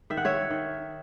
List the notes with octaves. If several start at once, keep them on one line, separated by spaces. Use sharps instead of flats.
D#3 E5
F#5
C#5 E5
D#3